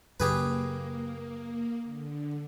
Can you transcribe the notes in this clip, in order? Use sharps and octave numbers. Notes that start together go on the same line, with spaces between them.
F#2 C#3 A#3 G4 G#4 B4
D3